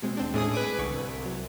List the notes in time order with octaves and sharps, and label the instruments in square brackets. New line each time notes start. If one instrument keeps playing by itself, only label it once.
[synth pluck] B2 G#3 C4
D#2 C4 D4
[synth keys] A2 G#4 D#6 [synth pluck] G#3 C#4 D4
[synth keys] B4 G#5 D6
[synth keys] C2 [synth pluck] D3 C#6
[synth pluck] F#3